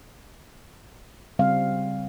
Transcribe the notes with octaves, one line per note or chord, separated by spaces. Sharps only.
C#3 G3 C4 F5